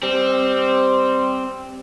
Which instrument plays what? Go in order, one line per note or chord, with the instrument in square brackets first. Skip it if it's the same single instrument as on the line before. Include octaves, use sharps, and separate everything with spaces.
[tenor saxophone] G3 [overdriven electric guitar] C4